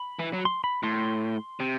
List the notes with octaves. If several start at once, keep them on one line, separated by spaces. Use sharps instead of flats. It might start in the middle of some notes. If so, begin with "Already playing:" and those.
Already playing: B5
E3
F#3
C6
B5
A2 C6
C3